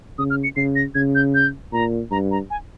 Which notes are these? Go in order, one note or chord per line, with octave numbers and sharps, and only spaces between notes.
C#3 D#6
F6
C#7
C#3 C7
A#6
C#3 G#6
G6
G6
A#2 A#5
G2 A#5
A#5
G#5